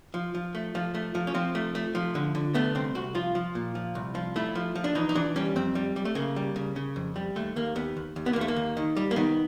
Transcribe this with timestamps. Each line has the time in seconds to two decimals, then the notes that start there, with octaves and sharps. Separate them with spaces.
0.14 F3
0.35 F3
0.55 A3
0.75 F3
0.95 A3
1.15 F3
1.27 C#4
1.35 F3 C4
1.55 A3
1.75 A3
1.95 F3
2.15 D3
2.35 D3
2.54 A3 B3
2.75 C2 C4
2.95 C2 F#4
3.15 F3 F4
3.35 F3
3.55 A#2
3.75 F3
3.95 C2
4.15 F3
4.36 A3 E4
4.55 F3
4.75 F3
4.84 D4
4.95 E3 D#4
5.09 D#4
5.15 E3 D4
5.36 G3 C#4
5.56 F2 C4
5.75 G3
5.96 G3
6.05 A3
6.15 C#3 A#3
6.36 G3
6.56 C#3
6.76 C#3
6.96 F2
7.16 G3
7.36 D#2 A3
7.56 D#2 A#3
7.76 D#2 B3
7.97 D#2
8.16 D#2
8.26 B3
8.33 A#3
8.36 D#2
8.41 A3
8.48 A#3
8.56 D#2
8.77 D#3
8.97 G3
9.11 A#3
9.16 D#3 B3